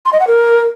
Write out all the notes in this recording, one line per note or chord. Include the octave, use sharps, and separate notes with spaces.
C6
D#5
F#5
A#4